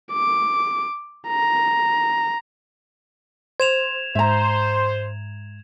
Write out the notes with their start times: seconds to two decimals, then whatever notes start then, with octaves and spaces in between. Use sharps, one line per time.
0.13 D6
1.28 A#5
3.60 C5 G#6 E7 F7
4.15 G#2 C5 E5 A#5